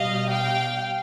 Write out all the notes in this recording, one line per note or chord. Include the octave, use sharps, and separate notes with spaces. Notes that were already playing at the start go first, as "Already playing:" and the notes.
Already playing: B2 G3 D#5 F5
F5 G5